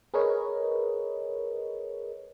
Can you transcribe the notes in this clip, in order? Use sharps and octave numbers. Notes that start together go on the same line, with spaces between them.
G#4 A#4 B4 C#5 D#5